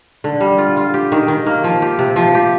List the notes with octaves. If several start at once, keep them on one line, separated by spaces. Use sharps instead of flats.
D3
G3
F4
F4
G4
D#3
D#3
A#3
F3
G4
C3
F3
G4